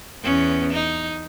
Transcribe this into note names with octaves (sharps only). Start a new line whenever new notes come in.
E2 B3 C#4
D#4